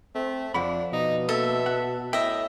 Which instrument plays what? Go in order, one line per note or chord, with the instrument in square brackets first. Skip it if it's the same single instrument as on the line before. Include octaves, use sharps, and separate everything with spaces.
[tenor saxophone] A3 [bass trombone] C4
[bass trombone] F2 [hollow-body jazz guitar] F3 F#5 B5 [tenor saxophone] D4
[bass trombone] B2 [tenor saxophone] D#4
[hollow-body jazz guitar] A#3 [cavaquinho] A4 [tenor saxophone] E5
[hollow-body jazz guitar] F#5
[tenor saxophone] A2 [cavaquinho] D#5 E5 [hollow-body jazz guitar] G5